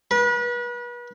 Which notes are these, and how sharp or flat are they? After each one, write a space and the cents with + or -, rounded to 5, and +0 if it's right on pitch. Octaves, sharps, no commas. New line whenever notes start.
B4 -35